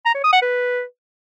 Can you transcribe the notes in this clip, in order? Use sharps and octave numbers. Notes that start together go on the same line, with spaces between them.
A#5
C#5
D#6
F#5
B4